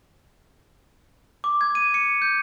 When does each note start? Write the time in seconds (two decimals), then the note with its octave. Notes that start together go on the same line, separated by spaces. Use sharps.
1.44 D6
1.61 G#6
1.75 D#7
1.94 C#7
2.22 G6